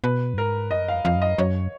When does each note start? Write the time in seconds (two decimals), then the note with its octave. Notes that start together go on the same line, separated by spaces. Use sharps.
0.04 B2 B4
0.34 F#2
0.37 G#2 A#4
0.71 F#2 D#5
0.88 F5
0.94 F2
1.05 F2 F5
1.16 F#2
1.22 D#5
1.38 F#2 C#5